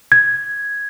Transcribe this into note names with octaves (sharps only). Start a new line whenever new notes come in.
G#6